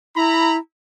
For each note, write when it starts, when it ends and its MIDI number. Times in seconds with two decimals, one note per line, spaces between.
0.16 0.57 64
0.16 0.56 82
0.16 0.56 83